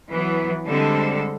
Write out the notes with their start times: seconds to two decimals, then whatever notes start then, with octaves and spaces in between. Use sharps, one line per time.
0.10 E3 F#3 B3
0.66 D3 G3 G#3 C4 A4